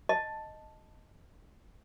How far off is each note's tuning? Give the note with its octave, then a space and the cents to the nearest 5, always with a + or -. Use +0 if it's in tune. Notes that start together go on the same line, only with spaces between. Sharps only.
D#5 +0 A5 +0